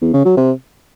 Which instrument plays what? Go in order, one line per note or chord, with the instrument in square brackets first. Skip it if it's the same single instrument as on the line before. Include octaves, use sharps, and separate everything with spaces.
[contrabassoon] E2
C#3
F#3
C3